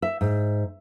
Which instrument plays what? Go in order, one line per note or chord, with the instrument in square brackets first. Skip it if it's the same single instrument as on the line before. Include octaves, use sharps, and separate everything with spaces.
[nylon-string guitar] E5
G#2